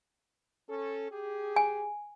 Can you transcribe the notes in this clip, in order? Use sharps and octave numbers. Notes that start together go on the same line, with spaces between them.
C#4 A4
G4 G#4
G#5